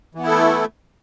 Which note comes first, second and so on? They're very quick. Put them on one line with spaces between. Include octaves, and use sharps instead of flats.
E3 B3 E4 A4 A3